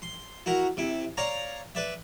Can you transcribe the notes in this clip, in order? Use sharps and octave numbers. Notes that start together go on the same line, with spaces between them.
C6
E4 F#4 A#4
C3 E4
C#5 D5 F5 A#5
B4 D5 E5